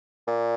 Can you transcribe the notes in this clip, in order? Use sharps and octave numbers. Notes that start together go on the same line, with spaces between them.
A#2